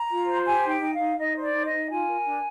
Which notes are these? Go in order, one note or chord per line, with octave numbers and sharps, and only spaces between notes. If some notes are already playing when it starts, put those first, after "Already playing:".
Already playing: A#5
F4
C5
G4 G#5
D#4
G5
D#4
F5
D#4
D#4 D#5
C5 D5
D#4
D#5
D#4
F4 G#5
A#4
D4